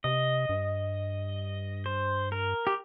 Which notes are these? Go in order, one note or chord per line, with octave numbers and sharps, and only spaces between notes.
C3 D#5
G2
C5
A#4
G4